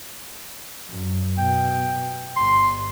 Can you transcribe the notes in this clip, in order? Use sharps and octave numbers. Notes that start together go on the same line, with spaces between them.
F#2
B2 G5
G1 C6